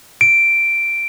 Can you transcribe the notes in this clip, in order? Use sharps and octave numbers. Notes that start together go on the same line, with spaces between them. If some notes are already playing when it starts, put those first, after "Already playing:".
D7